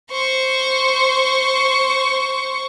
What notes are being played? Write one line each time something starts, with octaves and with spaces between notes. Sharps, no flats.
C5 C#6